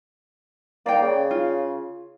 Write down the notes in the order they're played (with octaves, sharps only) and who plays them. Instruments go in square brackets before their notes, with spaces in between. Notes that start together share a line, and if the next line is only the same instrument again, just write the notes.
[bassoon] A#3 [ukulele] D5 G5
[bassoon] C#3
[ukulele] F4